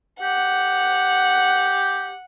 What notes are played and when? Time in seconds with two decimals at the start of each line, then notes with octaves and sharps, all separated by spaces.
0.22 G4 F#5